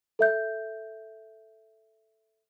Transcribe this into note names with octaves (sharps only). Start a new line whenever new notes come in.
A4 E5 G6